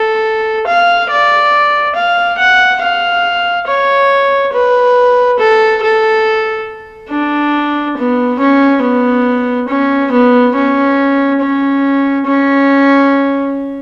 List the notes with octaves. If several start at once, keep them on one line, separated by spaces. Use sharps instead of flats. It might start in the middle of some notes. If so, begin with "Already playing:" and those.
Already playing: A4
F5
D5
F5
F#5
F5
C#5
B4
A4
A4
D4
B3
C#4
B3
C#4
B3
C#4
C#4
C#4